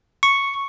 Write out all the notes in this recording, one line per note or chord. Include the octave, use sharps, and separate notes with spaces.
C#6